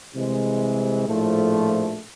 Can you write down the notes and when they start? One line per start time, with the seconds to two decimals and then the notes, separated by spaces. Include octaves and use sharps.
0.14 C2 C3 E3 G#3
1.07 A#1 A2 F3 A3